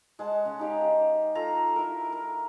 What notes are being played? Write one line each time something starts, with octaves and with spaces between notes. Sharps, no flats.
G#3 F#5 A5
C#3
D#4 G4 F5
F4 A4 A#5
E4 A#4
A#4